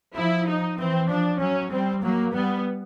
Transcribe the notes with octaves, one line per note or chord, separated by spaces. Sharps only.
F3 E4
D#4
E3 C4
F3 D4
F#3 C#4
G3 C4
F#3 A#3
G3 B3